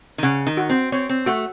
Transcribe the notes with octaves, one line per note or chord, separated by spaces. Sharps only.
D#3
C#3 F#5
D#3
F#4
C4
C4 C#5
C4
A3 F#4